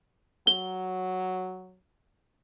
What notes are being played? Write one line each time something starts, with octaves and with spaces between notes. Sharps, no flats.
F#3 G7